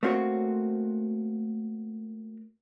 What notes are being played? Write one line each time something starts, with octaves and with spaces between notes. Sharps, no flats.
A3 A#3 C4 F#4 C#5